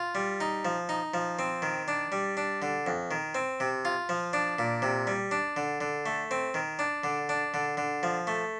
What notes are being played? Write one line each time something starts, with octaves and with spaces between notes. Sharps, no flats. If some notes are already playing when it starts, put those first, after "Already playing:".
Already playing: F4
G3
D#4
F3
D#4
F3
C4
D#3
D4
G3
D4
D3
F2
D#3
C4
C3
F4
F3
D4
A#2
C3
G3
D4
D3
D3
A3
C4
D#3
D4
D3
D4
D3
D3
F3
A3